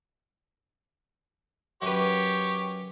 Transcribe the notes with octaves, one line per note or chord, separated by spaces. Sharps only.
F#2 G4 B4 C#5